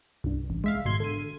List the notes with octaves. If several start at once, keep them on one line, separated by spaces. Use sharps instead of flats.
C2 G2
A1
G#3 E5 F5
G#1 B2 C6 G#6
D3 D#7